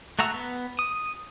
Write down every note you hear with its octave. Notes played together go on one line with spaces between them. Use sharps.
A3 F#4 F#5 A#5 E6
B3
D#6